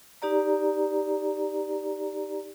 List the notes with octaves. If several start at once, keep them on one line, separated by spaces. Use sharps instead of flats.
D#4 G4 D5 A#5